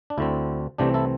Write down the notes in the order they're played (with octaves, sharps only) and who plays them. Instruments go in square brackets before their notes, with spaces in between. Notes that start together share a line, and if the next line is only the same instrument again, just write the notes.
[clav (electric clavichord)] D4
D2 D3 C4 E4
C2 C3 E3 A3 C4 D4 G4
E4 A4